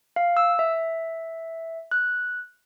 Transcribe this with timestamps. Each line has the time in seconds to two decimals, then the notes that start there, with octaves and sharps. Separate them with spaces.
0.16 F5
0.37 E6
0.59 E5
1.91 F#6